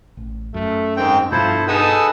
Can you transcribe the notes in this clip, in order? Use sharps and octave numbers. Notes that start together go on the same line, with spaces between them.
A1
F#2 A3
G#2 D#3 C4 G5
G2 B2 F3 E4 A4 C5
D#4 G#4 A4 B4 F#5 D#6 E6